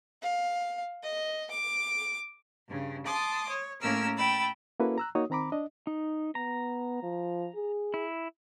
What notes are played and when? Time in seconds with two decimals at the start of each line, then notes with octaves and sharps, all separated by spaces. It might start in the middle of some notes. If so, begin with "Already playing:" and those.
0.23 F5
1.03 D#5
1.51 D6
2.68 G2 C#3
3.06 A5 C6 D6 D#6
3.48 C#5
3.81 A2 A#3 C#4 A#4 E6 F6
4.16 G5 B5 E6 A6
4.80 A#3 C#4 E4 F#4 A4 B4
4.98 A#5 E6 F#6
5.15 A#3 D#4 F#4 C#5 D#6
5.30 D#3 C4 A#5 B5 D6
5.52 D4 D#5
5.87 D#4
6.35 B3 A#5
7.03 F3
7.55 G#4
7.94 E4